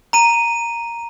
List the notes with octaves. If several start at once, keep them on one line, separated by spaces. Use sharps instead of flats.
A#5 D#7